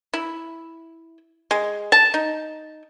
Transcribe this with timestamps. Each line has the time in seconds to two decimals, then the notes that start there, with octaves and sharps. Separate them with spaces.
0.14 E4
1.51 G#3
1.92 A5
2.14 D#4